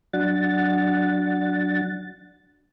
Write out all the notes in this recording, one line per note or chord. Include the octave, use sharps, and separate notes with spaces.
F#3 D4 F#5 A6